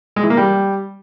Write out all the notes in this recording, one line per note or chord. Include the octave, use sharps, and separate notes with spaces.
G#3
E3
A#3
G3